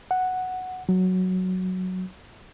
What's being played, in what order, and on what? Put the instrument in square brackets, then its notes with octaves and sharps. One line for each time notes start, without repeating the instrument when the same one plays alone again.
[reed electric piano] F#5
F#3